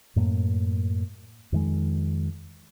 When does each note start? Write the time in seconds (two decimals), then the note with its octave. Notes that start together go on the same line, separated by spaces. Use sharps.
0.16 F#2 A2 A#3
1.52 F2 D#3 G#3